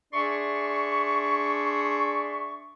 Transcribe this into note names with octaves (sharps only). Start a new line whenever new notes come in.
D4 G#4 D5 E5 C6 C#6